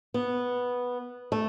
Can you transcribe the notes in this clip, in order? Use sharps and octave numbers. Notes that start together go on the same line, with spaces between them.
B3
A3